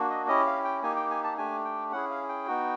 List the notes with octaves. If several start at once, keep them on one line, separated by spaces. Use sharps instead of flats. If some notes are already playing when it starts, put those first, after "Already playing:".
Already playing: A#3 D4 F#4
D#5
C#4 E4 G4 D#5
F5
G5
A#3 D#4 G4 G#5
G5
G#5
A5
A3 D4 G4 G#5
G5
C#4 E4 G#4 F#5
F5
G5
B3 D#4 F#4